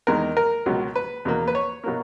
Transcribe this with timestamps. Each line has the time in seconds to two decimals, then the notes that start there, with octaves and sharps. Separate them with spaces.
0.07 E2 D#3 G#3 A#4
0.37 A#4
0.66 C#2 B2 F#3
0.96 B4
1.25 E2 B2 A#3
1.48 B4
1.55 C#5
1.84 B2 F#3 A#3